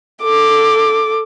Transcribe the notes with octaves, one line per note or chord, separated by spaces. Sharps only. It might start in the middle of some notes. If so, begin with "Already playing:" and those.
A4 D6